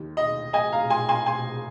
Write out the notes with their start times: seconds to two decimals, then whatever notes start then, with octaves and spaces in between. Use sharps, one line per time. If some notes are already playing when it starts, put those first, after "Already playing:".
Already playing: D#2 D#3
0.17 D#5
0.53 D#5 G#5
0.72 F5 A#5
0.90 G#5 C6
1.09 G#5 C6
1.26 G#5 C6